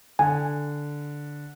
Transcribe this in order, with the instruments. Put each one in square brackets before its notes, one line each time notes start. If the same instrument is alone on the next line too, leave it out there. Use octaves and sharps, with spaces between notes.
[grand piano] D3 [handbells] G#5